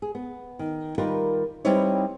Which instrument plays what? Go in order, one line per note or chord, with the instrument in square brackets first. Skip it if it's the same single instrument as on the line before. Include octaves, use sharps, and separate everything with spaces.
[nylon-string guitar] G#4
B3
D#3
D#3 G3 F4 A#4 B4
G3 C4 D#4 E4 B4 C#5